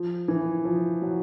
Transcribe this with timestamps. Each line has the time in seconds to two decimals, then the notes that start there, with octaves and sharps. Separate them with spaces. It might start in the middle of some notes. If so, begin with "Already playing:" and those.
Already playing: F3
0.28 E3
0.65 F3
1.02 F#3